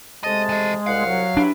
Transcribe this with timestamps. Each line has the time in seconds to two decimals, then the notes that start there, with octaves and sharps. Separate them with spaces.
0.24 C3 G#3 A3 D#5 A5
0.49 E3 D#5
0.86 C2 F5 F#5
1.05 F#3
1.37 D4 E4 G4 B4